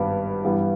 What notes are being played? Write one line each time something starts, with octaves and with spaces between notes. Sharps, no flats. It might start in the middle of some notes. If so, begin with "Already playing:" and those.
Already playing: G#1 G2 G3 B3
G2 E3 G3 B3